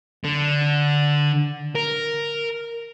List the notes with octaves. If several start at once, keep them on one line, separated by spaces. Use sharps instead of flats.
D3
A#4